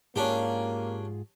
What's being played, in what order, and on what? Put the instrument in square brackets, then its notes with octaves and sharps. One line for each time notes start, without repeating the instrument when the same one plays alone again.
[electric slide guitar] G#2 F4 G#4 [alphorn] A#3 [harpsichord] C#4 D4 G4